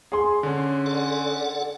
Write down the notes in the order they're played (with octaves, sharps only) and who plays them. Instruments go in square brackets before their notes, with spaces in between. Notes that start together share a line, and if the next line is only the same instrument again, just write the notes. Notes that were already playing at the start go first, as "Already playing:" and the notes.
[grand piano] G#4 C6
[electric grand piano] D3 C#4
[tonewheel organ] A4 D5 F#5